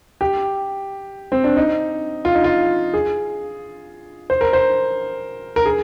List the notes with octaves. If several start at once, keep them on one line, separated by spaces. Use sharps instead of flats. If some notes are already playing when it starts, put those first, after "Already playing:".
G4
C4
D4
D#4
F4
D#4
F4
G#4
C5
A#4
C5
A#4
G#4